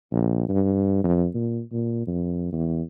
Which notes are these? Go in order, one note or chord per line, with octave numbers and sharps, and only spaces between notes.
A#1
G2
F2
A#2
A#2
F2
E2